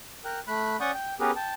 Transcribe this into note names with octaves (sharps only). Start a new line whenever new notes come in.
A#4 G5 F#6
A3 B5 F#6
C#4 D5 F#5 C#6 D#6 G6
G5
B3 C#4 G4 G#4 A#4 B4
G5 A5